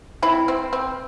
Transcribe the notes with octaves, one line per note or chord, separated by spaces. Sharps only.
C4 E4
C4
C4